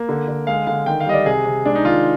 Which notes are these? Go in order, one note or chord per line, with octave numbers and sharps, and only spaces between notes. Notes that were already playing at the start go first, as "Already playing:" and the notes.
Already playing: A#3
D3
D3
G#3 F5
D3 F5
D#3 G5
F5
G3 D#5
D5
C3 G#4
C3
G#3 D4
D#4
D#3 F4